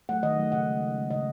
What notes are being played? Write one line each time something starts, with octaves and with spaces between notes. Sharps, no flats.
F#3 A3 F#5
D#3 D#5
F#3 A3
C#3 F#5
G#3
C#3
G#3
C#3 D#5